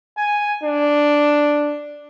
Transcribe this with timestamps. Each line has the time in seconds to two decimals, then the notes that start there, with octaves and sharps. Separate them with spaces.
0.18 G#5
0.63 D4